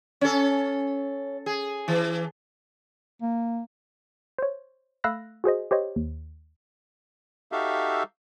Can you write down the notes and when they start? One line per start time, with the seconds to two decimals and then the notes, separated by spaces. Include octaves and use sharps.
0.21 C#4 A4
1.46 G#4
1.88 E3
3.22 A#3
4.38 C5 C#5
5.04 A3 F5 B5 E6 F#6 A#6
5.44 F#4 G#4 C5 D#5
5.71 G4 C5 C#5 D#5
5.96 D#2
7.52 D#4 F#4 G4 A4 E5 F5